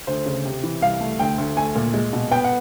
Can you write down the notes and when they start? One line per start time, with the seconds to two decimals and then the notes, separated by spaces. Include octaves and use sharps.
0.07 D2 C5
0.26 C#3
0.45 C3
0.63 E3
0.82 C2 F5
1.01 A3
1.19 D2 G5
1.38 D2
1.57 A3 G#5
1.75 A#2
1.94 G#3
2.13 B2
2.31 B3 G5
2.44 F#5